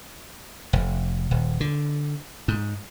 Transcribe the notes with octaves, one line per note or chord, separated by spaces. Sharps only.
F1
D#1
D3
G#2